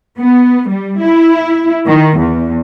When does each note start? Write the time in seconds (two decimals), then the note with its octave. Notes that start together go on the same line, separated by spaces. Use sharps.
0.19 B3
0.69 G3
1.00 E4
1.88 D#3
2.18 E2